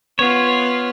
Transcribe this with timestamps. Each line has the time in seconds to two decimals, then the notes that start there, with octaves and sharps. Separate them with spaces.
0.19 B3 F4 C#5